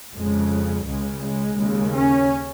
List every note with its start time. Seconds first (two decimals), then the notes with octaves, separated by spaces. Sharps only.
0.15 F2 C#3 G#3
0.85 C#2 C#3 G#3
1.21 G#3
1.56 D#2 C#3
1.91 C#4